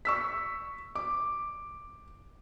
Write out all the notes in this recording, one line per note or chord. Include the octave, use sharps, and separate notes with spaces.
C#6 E6 B6
D6